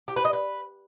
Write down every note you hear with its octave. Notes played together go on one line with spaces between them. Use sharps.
G4
B4
D#5
B4